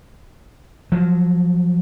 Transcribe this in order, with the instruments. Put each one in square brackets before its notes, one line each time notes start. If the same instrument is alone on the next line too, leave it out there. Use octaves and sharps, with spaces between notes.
[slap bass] F3 F#3